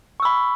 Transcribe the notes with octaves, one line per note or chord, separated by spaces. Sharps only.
B5 C#6 E6